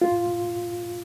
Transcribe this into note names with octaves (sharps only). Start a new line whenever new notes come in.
F4